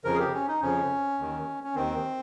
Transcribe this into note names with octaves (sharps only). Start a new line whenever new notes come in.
F2 C#3 F3 A#4
G#4
G4
C#4
D#4
F2 C#3 F3 C#4
D#2 D#3
C#4
D#2 D#3 C4